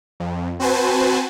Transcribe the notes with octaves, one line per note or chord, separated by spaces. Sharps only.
F2
C4 F#4 B4 C5 G#5 A5